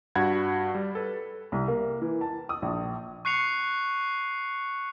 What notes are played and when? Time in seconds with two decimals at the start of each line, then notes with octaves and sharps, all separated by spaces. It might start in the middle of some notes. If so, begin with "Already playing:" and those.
0.15 G2 F#4 F#5 B5 G#6
0.75 G3
0.95 A4 B4
1.52 C2
1.68 A#3
2.02 E3
2.21 A5
2.49 D#6
2.62 A#1
3.25 C#6 F#6 C7 C#7 F7